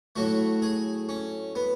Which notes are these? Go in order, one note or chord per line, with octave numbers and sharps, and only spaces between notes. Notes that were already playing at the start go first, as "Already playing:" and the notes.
A2 F#3 A3 F#4
G#4
C#4
B3